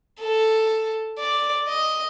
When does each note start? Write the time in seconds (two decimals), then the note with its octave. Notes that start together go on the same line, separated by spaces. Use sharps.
0.21 A4
1.19 D5
1.68 D#5